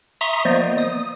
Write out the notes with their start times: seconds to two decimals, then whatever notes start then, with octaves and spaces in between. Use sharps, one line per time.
0.21 E5 A#5 C6 C#6 D#6
0.45 F3 A#3 B3 C5 D5 D#5
0.78 D#6